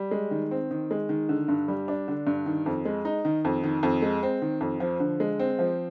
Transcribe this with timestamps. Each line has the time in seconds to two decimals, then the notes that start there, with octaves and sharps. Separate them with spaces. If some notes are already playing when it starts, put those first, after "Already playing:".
Already playing: G3
0.11 G#3
0.31 D#3
0.51 C4
0.71 D#3
0.91 G#3
1.09 D#3
1.29 D3
1.48 G2
1.68 G3
1.88 D4
2.08 D3
2.27 G2
2.46 D#3
2.66 F2
2.85 G#3
3.05 D#4
3.25 D#3
3.45 F2
3.63 D#3
3.83 F2
4.02 G#3
4.23 C4
4.42 D#3
4.61 F2
4.80 F3
5.00 D3
5.20 G#3
5.40 C4
5.59 F3